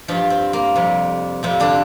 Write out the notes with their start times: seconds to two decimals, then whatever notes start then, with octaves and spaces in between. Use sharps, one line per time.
0.08 G2 F3 G3 F4
0.30 C4
0.53 A#3
0.76 F2 C3 G3
1.43 F2 C3 F3 C4
1.60 D3 D4